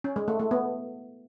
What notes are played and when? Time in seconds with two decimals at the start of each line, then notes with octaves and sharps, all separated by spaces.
0.04 C#4
0.16 G#3
0.28 A3
0.39 A3
0.51 B3